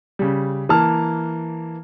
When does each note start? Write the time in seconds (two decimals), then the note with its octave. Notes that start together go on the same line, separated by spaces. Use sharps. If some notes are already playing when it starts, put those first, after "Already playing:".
0.19 C#3 G3
0.69 E3 A#3 A5 F6